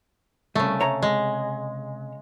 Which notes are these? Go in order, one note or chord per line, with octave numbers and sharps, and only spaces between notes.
C2 C#3 A3
C3 C#5 A#5
G#3